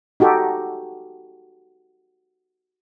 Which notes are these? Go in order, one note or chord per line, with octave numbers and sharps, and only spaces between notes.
D#4 F#4 G4 A4